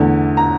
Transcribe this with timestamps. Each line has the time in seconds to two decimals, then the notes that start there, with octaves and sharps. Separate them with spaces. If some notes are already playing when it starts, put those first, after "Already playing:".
Already playing: E2 D3 A3
0.37 A#5